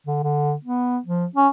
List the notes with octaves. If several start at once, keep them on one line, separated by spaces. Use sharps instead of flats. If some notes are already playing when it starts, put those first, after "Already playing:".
D3
D3
B3
F3
C#4